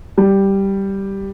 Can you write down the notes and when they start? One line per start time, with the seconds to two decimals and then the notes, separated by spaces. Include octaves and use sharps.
0.18 G3